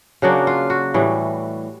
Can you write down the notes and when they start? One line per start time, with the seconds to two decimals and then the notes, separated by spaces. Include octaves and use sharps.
0.22 C#3 F#3 A#3 D4 F#4
0.47 F4
0.70 F#4
0.94 A2 E3 G3